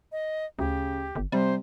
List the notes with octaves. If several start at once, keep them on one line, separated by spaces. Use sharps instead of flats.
D#5
D2 C#3 G4
G1
C3 G3 C5